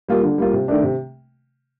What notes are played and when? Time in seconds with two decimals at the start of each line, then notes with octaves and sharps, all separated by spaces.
0.08 G3 A#3 F4
0.23 D3
0.38 G3 A#3 F4
0.53 C3
0.68 D#3 A3 D4
0.83 C3